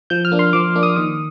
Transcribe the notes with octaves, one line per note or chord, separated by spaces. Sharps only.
F3 G6
F6
A#3 D4
C6
F3 D6
A#3 D4
D#6
D#3 D#6